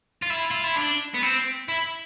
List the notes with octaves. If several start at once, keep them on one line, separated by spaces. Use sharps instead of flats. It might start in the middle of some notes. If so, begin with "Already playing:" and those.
F4
E4
F4
E4
D4
B3
C4
E4